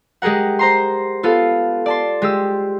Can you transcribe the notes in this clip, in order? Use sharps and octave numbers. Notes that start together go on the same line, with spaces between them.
G#3 G4 G#4 A#4 F#5
C5 A#5 C6
B3 F4 A4 F5
D5 A5 C6
G#3 G4 E6